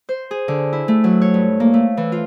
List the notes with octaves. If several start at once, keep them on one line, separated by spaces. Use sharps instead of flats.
C5
G#4
D3
E4
A3
F#3
C#5
G2
A#3
A3
E3
F4